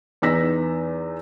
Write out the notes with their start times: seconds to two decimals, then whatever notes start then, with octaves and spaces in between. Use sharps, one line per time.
0.22 E2 B3 D#4 E6 A#6 B6